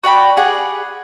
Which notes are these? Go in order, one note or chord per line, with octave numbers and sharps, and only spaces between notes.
F#4 D5 G5 B5
G4 G#4 F#5